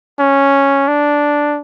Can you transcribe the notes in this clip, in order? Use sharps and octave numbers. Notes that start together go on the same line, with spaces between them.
C#4
D4